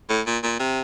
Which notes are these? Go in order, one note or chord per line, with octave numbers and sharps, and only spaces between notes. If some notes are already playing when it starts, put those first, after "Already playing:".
A2
A#2
A#2
C3